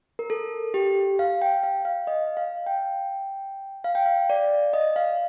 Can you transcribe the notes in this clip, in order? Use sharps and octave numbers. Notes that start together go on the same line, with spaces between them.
A#4
A4
G4
F5
G5
F5
F5
D#5
F5
G5
F5
G5
F5
D5
D#5
F5